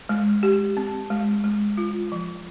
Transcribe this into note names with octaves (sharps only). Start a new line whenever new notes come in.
G#3
G4
C4
G#3
G#3
F4
F3